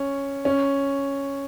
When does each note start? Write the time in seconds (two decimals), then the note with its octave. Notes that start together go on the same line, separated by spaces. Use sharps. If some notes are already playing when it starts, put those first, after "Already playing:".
Already playing: C#4
0.45 C#4